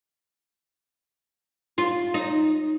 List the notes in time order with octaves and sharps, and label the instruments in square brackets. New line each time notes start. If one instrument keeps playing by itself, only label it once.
[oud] F4
D#4